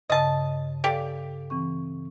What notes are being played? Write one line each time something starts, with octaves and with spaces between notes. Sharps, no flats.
G2 C#3 D#5 A5
G4 A4 D5 F5
E3 C4 C#6